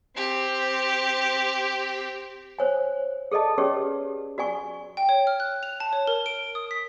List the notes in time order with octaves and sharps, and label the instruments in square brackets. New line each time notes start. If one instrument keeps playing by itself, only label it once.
[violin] C4 G4
[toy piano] C5 C#5 G#5
G#4 A4 D5 D#5 A5
C#4 G4 G#4 B4 C#5 D5
F#4 D5 G#5 C#6
[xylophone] G5
C#5
F6
F#6
F7
A5
C#5
A#4
D7
D#6
B6